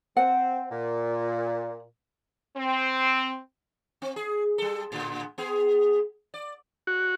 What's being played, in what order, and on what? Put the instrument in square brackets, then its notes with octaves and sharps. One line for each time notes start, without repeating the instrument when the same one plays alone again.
[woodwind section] C4 [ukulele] F#5
[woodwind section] A#2
[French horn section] C4
[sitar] C4
G#4
G3 A4
A2 D3
B3 G#4
D5
[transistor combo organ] F#4